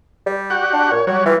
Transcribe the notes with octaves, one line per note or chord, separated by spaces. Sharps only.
G3
F#4 G4 F#5
D4
A#2 C#5
F#3 G3 F#4 C#5
E3 G3 F4